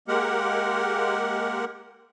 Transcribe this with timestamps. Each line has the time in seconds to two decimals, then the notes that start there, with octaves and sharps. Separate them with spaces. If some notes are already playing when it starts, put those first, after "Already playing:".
0.08 G#3 A#3 G4 A#4 F#5